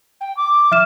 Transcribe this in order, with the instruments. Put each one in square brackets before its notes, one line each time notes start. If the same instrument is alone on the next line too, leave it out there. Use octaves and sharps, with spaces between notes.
[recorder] G5
D6
[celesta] E5 F6 E7